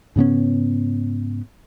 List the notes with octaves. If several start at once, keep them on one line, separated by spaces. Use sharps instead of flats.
G#2 C#3 B3 C#4